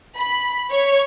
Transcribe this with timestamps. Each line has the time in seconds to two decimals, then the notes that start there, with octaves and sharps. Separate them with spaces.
0.17 B5
0.71 C#5